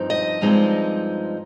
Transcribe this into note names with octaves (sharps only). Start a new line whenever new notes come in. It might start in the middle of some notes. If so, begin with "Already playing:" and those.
Already playing: G2 F3 C4 D#4
D#5
G2 F3 G#3 C4 D#4